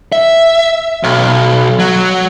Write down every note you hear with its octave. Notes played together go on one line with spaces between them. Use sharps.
E5
B1
F#3